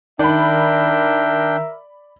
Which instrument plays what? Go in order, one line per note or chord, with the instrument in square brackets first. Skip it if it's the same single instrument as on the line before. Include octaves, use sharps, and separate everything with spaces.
[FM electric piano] D#3 [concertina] D4 G5 [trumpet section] A#4 E5 [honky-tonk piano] D5 B5